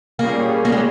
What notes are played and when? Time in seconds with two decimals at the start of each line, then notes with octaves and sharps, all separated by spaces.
0.19 A#2 G3 A#3 C#4 G#4
0.65 A#3
0.72 G#3